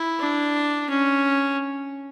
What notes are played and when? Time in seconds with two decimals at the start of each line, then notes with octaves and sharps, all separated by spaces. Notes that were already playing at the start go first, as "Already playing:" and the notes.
Already playing: E4
0.19 D4
0.89 C#4